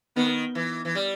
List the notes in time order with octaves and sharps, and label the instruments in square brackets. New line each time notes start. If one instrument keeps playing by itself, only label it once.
[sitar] D#3 [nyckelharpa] B3
[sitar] E3
E3
G3